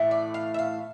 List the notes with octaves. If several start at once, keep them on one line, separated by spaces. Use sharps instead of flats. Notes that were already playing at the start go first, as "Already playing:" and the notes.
Already playing: A2 E3 A3 E4
D5
F5
E5
F5